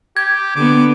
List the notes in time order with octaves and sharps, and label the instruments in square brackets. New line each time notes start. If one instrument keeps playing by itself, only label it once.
[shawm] G4 [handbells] G#6
[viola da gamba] D3 B3 [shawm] D6